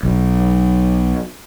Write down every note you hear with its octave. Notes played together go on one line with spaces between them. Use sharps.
B1